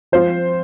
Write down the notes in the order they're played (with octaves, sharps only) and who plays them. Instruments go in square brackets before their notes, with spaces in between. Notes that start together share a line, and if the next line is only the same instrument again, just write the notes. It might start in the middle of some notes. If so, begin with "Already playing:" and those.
[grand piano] F3 C4 F4 C5